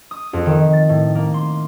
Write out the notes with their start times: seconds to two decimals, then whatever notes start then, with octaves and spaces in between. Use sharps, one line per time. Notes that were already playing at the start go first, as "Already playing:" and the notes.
0.11 D#6
0.33 F2
0.46 D#3
0.73 A6
0.89 A2
1.15 A#3
1.34 C6